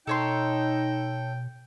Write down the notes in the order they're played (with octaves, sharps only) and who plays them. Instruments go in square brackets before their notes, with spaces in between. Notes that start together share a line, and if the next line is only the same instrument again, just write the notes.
[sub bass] B2 [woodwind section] D#4 [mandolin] A4 C#5 C6 [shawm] G5